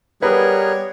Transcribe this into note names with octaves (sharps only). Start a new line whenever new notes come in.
G3 B3 G#4 A#4 B4 C#5